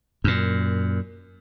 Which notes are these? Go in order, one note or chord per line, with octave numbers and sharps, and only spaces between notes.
F#2 A#2